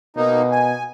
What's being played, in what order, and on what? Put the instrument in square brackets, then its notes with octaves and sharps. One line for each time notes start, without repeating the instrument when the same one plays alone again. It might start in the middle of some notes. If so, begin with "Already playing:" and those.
[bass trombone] B2 [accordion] A#3 D#4
[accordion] G#5